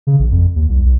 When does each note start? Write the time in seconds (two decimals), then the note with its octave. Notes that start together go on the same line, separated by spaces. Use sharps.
0.07 C#3
0.19 A1
0.32 F2
0.56 D#2
0.69 C2
0.85 C2